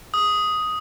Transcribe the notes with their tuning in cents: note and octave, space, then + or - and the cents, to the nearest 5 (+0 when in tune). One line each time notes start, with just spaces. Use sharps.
D#6 +5